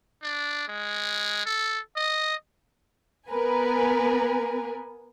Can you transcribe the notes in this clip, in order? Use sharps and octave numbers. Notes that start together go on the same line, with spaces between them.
D4
G#3
A4
D#5
B3 A#4 B4 G#5